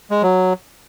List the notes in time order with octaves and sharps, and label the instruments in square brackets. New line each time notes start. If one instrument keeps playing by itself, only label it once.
[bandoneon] G#3
F#3